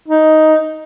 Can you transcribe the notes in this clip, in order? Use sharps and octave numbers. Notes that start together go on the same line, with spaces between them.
D#4